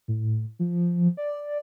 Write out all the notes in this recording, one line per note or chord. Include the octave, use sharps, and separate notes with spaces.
A2
F3
D5